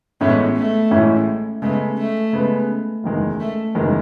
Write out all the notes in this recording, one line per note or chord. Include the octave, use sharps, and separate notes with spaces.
A1 A2 G#3 B3 C#4 E4
A3
A1 A2 G#3 C#4 E4
C#3 G#3 A3 B3
A3
C#3 G#3 B3
F#1 E2 D#3 G#3
A3
F#1 E2 D#3 G#3